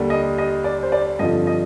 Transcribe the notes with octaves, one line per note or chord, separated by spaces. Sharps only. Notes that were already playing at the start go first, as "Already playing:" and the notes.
Already playing: D#2 D3 G3
D#5
D#5
D5
C5
D5
G2 D3 F3 C4 D#5
D#5